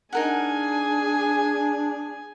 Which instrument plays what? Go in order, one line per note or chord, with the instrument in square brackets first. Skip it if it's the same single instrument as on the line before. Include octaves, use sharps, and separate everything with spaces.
[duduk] D4 [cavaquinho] D#4 A#4 F#5 [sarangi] G#4 [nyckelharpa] G#5